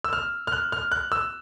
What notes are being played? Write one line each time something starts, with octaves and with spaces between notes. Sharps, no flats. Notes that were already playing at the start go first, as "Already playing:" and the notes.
E6
F6
F6
F#6
F6
F#6
E6